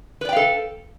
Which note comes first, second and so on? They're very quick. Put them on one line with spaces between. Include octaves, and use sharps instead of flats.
B4 D5 G5 F5 A4